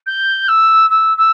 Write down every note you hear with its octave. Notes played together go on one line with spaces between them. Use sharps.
G6
E6
E6
E6